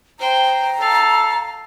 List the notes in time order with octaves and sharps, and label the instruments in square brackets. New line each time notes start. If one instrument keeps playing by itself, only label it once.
[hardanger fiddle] C5 G5 [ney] A#5
[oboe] A4 [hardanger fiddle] F5